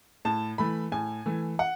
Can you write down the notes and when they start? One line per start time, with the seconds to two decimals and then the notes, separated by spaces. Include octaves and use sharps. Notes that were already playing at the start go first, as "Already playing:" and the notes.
0.25 A2 A5
0.58 E3 A3 B5
0.92 A2 G#5
1.26 E3 A3
1.59 F#5